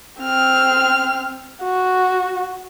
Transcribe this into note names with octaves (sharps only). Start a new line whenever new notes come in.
C4 F6
F#4